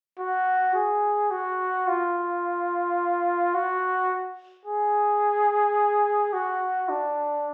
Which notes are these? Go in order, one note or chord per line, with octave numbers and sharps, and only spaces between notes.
F#4
G#4
F#4
F4
F#4
G#4
F#4
D4